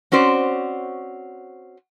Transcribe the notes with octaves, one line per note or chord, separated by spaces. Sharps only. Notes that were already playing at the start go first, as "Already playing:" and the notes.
C4 C#4 F#4 C5 D5